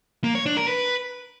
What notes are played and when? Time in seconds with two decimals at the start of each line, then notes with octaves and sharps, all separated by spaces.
0.24 A#3
0.35 C#5
0.46 D4
0.57 A#4
0.68 B4